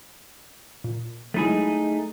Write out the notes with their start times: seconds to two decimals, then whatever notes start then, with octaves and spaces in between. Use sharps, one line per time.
0.84 A#2
1.34 F#3 G#3 A3 D#4 E4 G#4